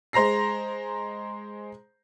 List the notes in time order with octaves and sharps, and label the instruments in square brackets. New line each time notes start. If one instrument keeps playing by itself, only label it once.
[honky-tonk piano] G#3 C5 A#5 A#6 C7